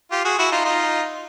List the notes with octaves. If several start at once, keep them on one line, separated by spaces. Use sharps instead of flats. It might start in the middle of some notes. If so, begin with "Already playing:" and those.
F4 G4
F#4 G#4
E4 F#4
D#4 F4
D#4 F4